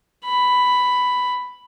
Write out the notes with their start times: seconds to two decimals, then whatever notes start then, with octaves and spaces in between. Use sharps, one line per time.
0.25 B5